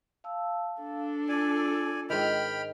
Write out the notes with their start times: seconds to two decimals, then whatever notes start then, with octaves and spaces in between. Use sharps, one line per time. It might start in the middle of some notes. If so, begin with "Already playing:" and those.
0.24 F5 A5 E6
0.82 D4 A4
1.29 F4 D5 G#5 E6
2.10 G#2 D#3 G5 B5 F6